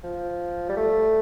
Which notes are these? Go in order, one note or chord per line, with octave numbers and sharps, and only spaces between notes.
F3
G3
A3